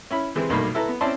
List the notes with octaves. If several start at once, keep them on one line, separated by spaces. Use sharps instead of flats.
C#4 E4 B5
C3 E3 G#3 C4
B1 G2 A3 A#3 D#4 B5
E4 A4 B4 A#5
B3
C4 C#4 E4 D5 A5 C6